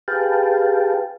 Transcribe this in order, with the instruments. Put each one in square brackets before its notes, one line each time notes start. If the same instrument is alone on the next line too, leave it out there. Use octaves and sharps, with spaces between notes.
[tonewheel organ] G4 G#4 B4 F5 G5 A5